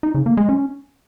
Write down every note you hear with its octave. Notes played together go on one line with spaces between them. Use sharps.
D#4
C#3
A#3
G#3
C#4